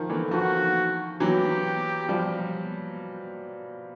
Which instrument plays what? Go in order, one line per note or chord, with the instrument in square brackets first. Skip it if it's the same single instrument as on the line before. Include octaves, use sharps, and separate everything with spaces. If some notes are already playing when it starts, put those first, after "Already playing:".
Already playing: [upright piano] D#3 F3
D3 E3
[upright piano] D#3 F3 [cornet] F#4
[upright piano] E3 F#3 [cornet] G4
[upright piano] F3 G3